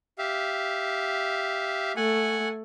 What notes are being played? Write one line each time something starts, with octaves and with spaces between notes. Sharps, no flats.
G4 E5 F5
A3 F#5 G#5